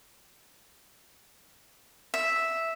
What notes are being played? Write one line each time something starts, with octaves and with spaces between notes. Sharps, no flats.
E5